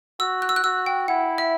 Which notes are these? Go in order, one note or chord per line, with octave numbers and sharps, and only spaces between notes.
F#4 E6
F#6
E6
F#6
F#4 E6
G5
E4 F#5
E5